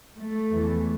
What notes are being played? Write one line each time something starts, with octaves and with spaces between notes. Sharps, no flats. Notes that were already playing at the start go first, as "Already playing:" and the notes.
A3
E2 E3